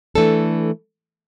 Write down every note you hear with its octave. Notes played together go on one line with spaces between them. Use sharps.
E3 A3 D4 A4